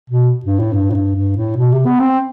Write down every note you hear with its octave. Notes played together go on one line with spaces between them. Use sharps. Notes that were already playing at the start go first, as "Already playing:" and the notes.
B2
G2
A2
G2
A2
G2
G2
A2
B2
C3
B3
C4